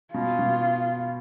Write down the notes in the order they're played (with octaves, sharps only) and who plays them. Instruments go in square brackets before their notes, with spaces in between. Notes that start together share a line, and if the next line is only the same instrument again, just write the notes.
[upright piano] B2 [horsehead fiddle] F4
[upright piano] B2